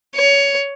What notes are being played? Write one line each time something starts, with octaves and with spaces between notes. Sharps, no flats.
C#5